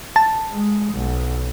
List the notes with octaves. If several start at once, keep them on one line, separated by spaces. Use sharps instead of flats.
A5
G#3
B1